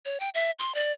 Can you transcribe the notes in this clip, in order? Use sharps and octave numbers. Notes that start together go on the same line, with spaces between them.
C#5
G5
E5
C6
D5